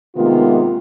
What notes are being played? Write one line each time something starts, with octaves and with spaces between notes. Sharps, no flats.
C3 D#3 G#3 A#3 B3 F4